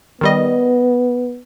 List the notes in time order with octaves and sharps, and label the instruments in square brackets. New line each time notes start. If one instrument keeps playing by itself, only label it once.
[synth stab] D#3 G3 D#5 [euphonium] B3